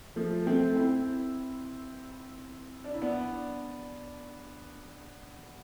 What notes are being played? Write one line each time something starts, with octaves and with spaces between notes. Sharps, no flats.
F3 A3
A3 C4
C4 E4
D4
E4
B3 D4